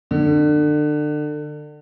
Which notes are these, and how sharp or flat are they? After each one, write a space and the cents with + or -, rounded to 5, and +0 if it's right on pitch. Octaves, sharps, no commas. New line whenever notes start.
D3 +30